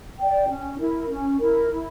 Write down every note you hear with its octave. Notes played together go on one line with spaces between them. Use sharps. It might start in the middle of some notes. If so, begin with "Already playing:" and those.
D5 G5
C#4
E4 A#4
C#4
E4 A#4
E4